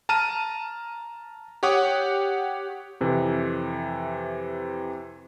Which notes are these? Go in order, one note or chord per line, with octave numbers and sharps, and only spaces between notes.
A5 A#5 F6 D#7
G4 C#5 F#5 D6 D#6
F2 C3 E3